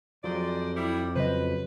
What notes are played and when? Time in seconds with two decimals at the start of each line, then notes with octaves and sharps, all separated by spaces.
0.24 F2 F#3 G#3 C5 D5
0.77 G3 E4
1.16 C#3 F#3 B4 C5 D#5